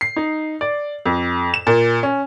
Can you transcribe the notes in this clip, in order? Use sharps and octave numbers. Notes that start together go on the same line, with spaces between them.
C7
D#4
D5
F2
E7
A#2
C#4